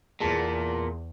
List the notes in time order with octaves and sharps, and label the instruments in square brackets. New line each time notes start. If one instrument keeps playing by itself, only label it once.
[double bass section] E2 [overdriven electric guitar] A#2 [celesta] G#4 A5